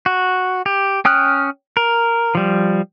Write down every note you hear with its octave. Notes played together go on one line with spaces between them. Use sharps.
F#4
G4
C#4 G5 D#6 F6 F#6
A#4
F3 G3